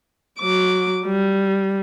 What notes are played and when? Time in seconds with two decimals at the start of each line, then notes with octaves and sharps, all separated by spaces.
0.39 F#3 D6
1.06 G3